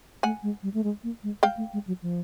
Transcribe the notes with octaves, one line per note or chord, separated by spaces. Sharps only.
A3 F#5 G#5
G#3
G3
A3
G#3
A#3
G#3
G#3 F5 G5
A3
G#3
F#3
F3